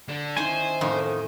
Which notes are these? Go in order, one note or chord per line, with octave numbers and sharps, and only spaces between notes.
D3
D#3 C#4 E4 C5 G#5
F2 A2 D#3